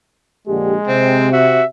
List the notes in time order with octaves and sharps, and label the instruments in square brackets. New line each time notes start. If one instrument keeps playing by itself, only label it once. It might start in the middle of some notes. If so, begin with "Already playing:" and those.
[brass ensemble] A#1 D3 G4 [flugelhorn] G#3
[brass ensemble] C3 [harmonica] C4
[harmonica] F#4 [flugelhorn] E5